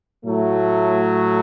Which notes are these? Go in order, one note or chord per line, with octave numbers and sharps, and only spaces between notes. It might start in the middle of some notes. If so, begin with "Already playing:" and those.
A2 F#3 A3